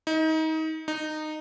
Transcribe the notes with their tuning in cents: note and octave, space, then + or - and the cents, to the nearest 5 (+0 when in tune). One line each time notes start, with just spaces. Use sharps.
D#4 +30
D#4 -15